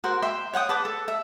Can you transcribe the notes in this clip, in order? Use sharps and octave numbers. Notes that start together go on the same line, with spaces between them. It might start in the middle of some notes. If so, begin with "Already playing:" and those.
F#4 A#4 C5
E5 G5 C6
C#5 F#5 G5 D#6
B4 A5 D6
A4
E5